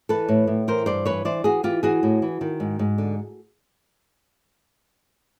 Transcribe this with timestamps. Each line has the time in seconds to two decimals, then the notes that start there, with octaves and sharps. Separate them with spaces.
0.09 E3 A4 B4
0.28 A2
0.47 A2
0.68 E3 A#4 C5
0.86 G2 C5 D5
1.05 E3 B4 C#5
1.25 E3 C5 D5
1.44 E3 F#4 G#4
1.63 E3 F4 G4
1.83 E3 F#4 G#4
2.03 A2
2.22 E3
2.41 D#3
2.60 G#2
2.79 G#2
2.98 D3